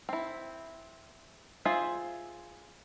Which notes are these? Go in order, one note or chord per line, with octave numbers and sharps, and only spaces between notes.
C4 E4
F4 G#4 C5 E5